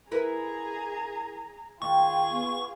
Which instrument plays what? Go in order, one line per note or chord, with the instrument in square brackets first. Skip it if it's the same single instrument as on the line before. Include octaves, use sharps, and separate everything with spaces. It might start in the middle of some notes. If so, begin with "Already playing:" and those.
[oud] E4 A#4 B4 [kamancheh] G#4 A#5
[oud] D#2 [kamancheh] F4 G#4 [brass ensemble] G5 [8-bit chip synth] C#6
[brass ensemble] B3